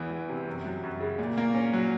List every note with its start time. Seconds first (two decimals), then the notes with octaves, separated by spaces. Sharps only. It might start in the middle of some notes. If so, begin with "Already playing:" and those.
Already playing: E2 E3
0.10 E2
0.29 C3
0.47 F#2
0.65 F#3
0.84 F#2
1.01 C#3
1.19 A#2
1.38 A#3
1.55 C#4
1.73 F#3